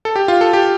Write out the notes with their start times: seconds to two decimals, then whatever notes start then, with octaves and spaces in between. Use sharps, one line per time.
0.05 A4
0.16 G4
0.28 F4
0.41 A4
0.53 G4